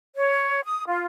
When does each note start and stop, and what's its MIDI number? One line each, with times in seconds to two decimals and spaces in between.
0.15 0.61 73
0.64 0.84 87
0.86 1.05 65